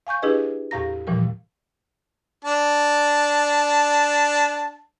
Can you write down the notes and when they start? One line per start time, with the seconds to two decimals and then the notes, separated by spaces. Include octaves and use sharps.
0.07 F5 G#5 C#6 G6
0.22 D4 E4 G4 G#4 B4 D#5
0.71 E2 A2 G4 F5 A#5 A#6
1.07 A#2 E3 F3 G3 A#4
2.44 D4 A5